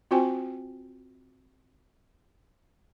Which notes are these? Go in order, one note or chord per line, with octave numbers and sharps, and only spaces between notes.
C4 F4 F#4 C5 G5 G#5